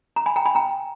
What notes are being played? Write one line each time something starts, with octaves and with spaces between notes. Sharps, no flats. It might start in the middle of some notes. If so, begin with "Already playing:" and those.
A#5
G#5 B5
G5 A#5
G#5 B5
G5 A#5